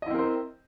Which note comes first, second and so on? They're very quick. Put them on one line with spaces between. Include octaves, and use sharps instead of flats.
D#5 E4 C4 A#4 C5